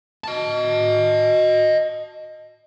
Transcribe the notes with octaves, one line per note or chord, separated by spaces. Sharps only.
D#5 A5